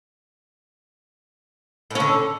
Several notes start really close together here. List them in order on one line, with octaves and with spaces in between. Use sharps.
A2 C#4 D3